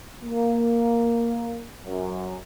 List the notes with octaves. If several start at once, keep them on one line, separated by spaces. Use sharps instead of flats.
A#3
F#2